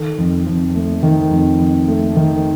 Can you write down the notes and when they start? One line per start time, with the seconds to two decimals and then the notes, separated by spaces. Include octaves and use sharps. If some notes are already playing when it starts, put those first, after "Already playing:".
Already playing: D#3 A4
0.18 F2
0.47 F2
0.75 A3
1.03 D#3
1.31 F2
1.59 F2
1.88 A3
2.16 D#3